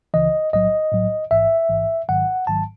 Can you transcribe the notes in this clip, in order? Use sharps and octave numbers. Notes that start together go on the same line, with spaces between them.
C#2 C#3 E3 D#5
B1 A2 F#3 D#5
B1 A2 F#3
A1 G#2 E3 E5
A1 G#2 E3
G#1 G#2 D#3 F#3 F#5
G#1 G#2 D#3 F#3 A5